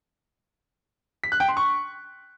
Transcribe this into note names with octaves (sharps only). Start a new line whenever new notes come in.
B6
F#6
G5
C6
C#6